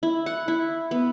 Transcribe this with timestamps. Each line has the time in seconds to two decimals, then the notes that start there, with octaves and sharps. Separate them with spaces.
0.03 E4
0.26 F#5
0.48 E4
0.91 B3